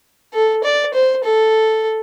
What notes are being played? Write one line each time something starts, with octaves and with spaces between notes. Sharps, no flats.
A4
D5
C5
A4